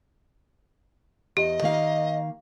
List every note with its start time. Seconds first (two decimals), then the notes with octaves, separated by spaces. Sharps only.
1.37 E2 G4 D#5
1.62 D#3 A#3 F5